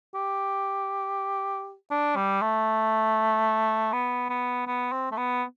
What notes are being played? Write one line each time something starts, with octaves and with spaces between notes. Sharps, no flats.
G4
D4
G3
A3
B3
B3
B3
C4
A3
B3